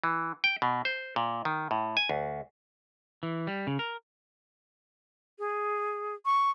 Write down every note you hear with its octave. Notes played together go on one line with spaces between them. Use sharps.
E3
G5
B2
C5
A#2
D#3
A2
G#5
D2
E3
G3
C#3
A#4
G#4
C#6